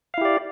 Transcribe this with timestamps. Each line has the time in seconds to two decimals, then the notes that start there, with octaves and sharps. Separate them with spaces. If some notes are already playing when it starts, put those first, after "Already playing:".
0.14 F5
0.18 E4
0.21 G4
0.25 D5